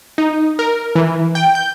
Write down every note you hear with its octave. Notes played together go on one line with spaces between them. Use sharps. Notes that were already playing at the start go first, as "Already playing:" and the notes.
D#4
A#4
E3
G5
G6